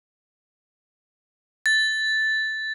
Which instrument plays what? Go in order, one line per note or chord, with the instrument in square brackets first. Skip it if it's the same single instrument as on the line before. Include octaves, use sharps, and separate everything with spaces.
[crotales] A6